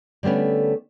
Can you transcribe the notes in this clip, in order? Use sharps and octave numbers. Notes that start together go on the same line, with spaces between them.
D3 G3 A3 B3 C#4